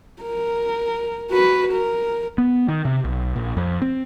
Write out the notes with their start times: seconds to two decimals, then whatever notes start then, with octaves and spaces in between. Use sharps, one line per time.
0.22 A#4
1.31 F#4 B4
1.72 A#4
2.38 B3
2.68 D#3
2.85 C3
3.04 B1
3.36 A#1
3.57 F2
3.82 C4